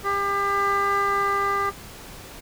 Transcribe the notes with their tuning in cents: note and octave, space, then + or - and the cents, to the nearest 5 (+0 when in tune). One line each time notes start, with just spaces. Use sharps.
G4 +30